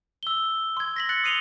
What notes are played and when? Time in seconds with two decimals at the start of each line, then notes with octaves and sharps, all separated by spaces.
0.23 E6 G7
0.77 C6 G#6
0.96 A#6 B6 F#7
1.09 F#6 A6 C#7 F#7
1.24 D#6 C7 D#7 F7 G7